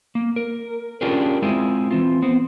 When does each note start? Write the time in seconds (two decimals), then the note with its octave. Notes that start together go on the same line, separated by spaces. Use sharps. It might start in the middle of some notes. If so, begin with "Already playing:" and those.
0.15 A#3
0.36 A#4
1.01 C#4 D4 F4 G4 G#4 A#4
1.42 G#3 C4 E4 F4 G#4
1.91 E3 C4 F4
2.22 B3 C4